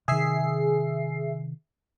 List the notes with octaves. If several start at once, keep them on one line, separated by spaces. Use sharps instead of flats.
C3 D#3 G#4 E5 C7